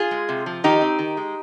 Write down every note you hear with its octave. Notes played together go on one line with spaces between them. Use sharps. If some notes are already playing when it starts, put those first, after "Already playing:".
Already playing: F4 G#4
G#3
C3
F3
D#3 D#4 G4
C4
D#3
G#3